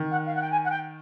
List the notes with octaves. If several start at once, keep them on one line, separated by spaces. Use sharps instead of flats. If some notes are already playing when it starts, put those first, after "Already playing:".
Already playing: D#3
F#5
F5
F#5
G5
G#5
F#5
G5